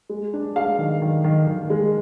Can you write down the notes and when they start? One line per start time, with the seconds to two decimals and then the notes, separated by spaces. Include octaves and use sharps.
0.09 G#3
0.33 D4
0.56 G#3 F5
0.78 D#3
1.02 D#3
1.24 D#3
1.47 D#3
1.70 G#3